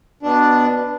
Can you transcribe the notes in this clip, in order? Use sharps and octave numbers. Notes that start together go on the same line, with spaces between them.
B2 D4